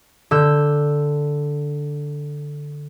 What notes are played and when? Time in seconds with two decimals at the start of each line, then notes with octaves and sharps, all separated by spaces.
0.31 D3 E6 G6